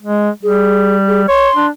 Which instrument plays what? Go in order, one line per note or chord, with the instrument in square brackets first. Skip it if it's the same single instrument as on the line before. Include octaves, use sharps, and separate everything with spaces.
[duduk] G#3
[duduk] G3 [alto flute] G#4
[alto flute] G#4
[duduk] C#5 [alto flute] C6
[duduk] D4